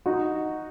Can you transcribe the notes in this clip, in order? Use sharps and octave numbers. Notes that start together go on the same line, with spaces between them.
D#4 F#4